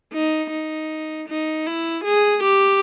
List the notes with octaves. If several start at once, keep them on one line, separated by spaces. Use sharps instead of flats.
D#4
D#4
D#4
E4
G#4
G4